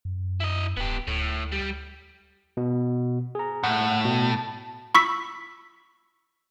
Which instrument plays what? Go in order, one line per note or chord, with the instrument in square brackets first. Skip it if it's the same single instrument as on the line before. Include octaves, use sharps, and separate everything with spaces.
[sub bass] F#2
[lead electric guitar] E4 D#5
[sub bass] D1 [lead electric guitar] B3 G4
[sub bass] D2 [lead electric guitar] A2
[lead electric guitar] G3
[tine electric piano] B2
G#4 A#5
[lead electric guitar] A2 [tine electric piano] F#5
[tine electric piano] B2
A5
[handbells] B5 C#6 E6 B6